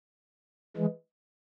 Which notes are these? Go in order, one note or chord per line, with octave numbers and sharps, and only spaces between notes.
E3 G#3